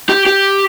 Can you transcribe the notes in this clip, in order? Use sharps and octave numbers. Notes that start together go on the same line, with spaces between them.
G4
G4